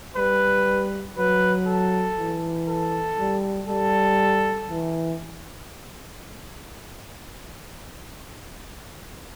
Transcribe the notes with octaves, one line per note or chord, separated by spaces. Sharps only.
G3 B4
F#3 B4
A4
E3
A4
G3
G3 A4
E3